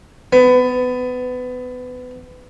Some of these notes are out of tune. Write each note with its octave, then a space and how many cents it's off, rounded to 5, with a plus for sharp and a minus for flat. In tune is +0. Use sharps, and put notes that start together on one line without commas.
B3 +25